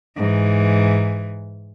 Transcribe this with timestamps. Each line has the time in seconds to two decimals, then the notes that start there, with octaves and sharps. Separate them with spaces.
0.16 G#2 E3